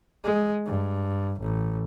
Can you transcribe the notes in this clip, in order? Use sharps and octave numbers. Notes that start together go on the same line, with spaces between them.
G#3
G2
A1